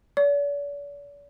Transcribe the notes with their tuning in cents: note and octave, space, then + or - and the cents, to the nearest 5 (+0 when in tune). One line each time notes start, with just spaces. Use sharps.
D5 -45